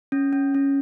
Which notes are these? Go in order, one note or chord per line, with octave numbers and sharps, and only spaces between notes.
C#4
C#4
C#4